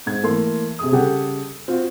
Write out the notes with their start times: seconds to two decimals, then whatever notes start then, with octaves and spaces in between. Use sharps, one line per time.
0.06 G#2 G#6
0.23 E3 A3 A#3 C6
0.79 C3 G#4 D#6
0.92 C#3 G3 G4 A4 F#5 G5
1.68 C4 F4 F#4